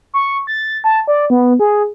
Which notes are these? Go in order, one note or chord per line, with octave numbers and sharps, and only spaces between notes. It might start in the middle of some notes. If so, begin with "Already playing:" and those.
C#6
A6
A5
D5
B3
G#4